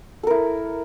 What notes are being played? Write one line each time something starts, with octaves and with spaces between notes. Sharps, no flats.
E4 A4 A#4